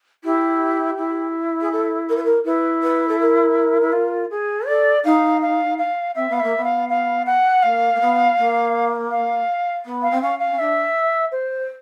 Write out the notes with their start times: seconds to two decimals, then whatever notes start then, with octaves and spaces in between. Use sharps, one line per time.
0.24 E4 G4
0.97 E4
1.60 G#4
1.71 A4
2.09 A#4
2.16 B4
2.24 A#4
2.45 E4 B4
2.82 B4
3.08 A4
3.19 A#4
3.82 E4
3.93 F4
4.31 G#4
4.67 A4 D5
5.04 D#4 F5
5.42 F5
5.78 F5
6.15 C4 E5
6.29 B3 F5
6.40 A#3 E5
6.56 B3
6.64 F5
6.89 F5
7.26 F#5
7.63 A#3 F5
7.94 A#3
8.00 B3
8.37 A#3
9.11 F5
9.84 B3
10.02 F5
10.10 C4
10.21 C#4 F5
10.39 F5
10.50 C#4
10.58 D4 E5
11.32 C5